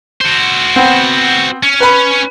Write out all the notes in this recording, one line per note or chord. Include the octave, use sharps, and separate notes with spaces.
F#4 C5
B3 C4
C#4
B4 B5